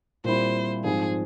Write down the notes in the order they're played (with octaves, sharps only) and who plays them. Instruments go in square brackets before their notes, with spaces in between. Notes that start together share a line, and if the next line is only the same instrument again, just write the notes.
[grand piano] A#2 G3 C4 E4 [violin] C5
[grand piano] G#2 F3 C4 F4 [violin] G#4